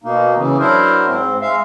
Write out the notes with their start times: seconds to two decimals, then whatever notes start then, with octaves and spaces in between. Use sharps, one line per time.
0.04 B2 A#3 D#4
0.37 C#3 E3
0.59 F#3 D4 E4 A#4 C5
1.07 G#2 C4
1.41 G#3 E5 F5